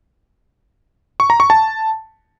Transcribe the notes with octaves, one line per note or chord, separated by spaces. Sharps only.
C#6
A#5
C#6
A5